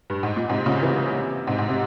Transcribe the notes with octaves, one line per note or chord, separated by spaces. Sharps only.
G2
G#2
A#2
G#2 C3
A#2 C#3
C3 E3
G#2 C3
G#2
C3